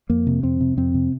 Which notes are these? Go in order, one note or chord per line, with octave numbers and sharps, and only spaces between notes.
F2 A#3
C3
F2 C4
C3
F2 C4
C3